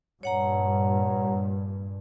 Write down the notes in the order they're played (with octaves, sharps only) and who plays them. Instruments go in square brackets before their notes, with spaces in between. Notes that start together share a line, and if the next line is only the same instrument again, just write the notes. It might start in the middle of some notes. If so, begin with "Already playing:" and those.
[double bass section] G2 A#2 [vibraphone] C#5 F#5 A#5